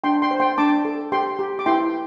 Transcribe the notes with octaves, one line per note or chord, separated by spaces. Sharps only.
D4 G5 C6
G5 C6
C5
G5 C6
D4 A5 D6
A4
G4 G5 C6
G4
D6
E4 G5 C6